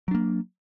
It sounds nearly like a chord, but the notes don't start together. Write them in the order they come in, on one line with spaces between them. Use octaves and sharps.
F#3 D4 A#3